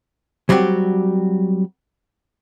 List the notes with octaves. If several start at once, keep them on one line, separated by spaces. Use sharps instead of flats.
F#3 G3 C4 F#4 G4